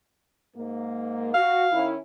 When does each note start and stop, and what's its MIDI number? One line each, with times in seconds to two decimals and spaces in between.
0.56 1.33 44
0.56 1.33 58
1.34 1.64 66
1.34 1.86 77
1.72 1.95 51
1.72 1.95 61
1.72 1.95 64